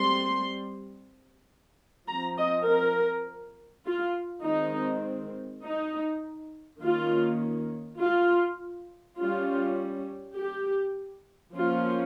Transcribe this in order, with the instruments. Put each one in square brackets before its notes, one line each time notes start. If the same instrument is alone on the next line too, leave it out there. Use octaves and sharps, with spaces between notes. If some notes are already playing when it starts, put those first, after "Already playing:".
Already playing: [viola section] G3 C4 C6
F3 C4 A#5
D#5
A#4
F4
D#3 G#3 C4 D#4
D#4
D#3 A#3 C#4 F4
F4
G3 C#4 F4
G4
F3 A#3 C#4 F4